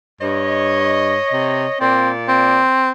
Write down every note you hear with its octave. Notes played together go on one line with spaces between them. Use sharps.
G2 C#5 D#5
C3
A#2 C4 D5
C4